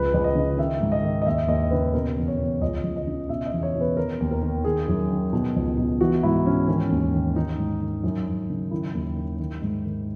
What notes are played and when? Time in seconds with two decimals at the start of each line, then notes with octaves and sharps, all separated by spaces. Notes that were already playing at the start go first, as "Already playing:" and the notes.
Already playing: C#2 B4
0.14 C#2
0.24 D#5
0.35 C#3
0.58 D#3 E5
0.80 G#2
0.92 D#5
1.03 D#3
1.22 D#5
1.26 D#2 E5
1.48 D#2 D#5
1.71 C#3 B4
1.93 B2 A#4
2.17 E2
2.28 C#5
2.39 B2
2.61 C#2 D#5
2.84 C#2
2.96 D#5
3.07 C#3
3.29 B2 E5
3.46 D#5
3.52 E2
3.63 C#5
3.75 B2
3.81 B4
3.97 D#3 A#4
4.20 D#2
4.31 A#4
4.42 D#3
4.64 D#3 G#4
4.88 F#2
5.11 D#3
5.33 B2
5.56 C#2
5.78 B2
6.01 E3 F#4
6.23 G#2 E4
6.45 E3 C#4
6.68 D#3 C#4
6.91 D#2
7.14 D#3
7.36 D#3 D#4
7.58 G#2
7.81 D#3
8.03 F#2
8.27 F#2
8.50 C#3
8.71 D#3 E4
8.94 D#2
9.17 D#3
9.39 D#3
9.62 G#2
9.84 D#3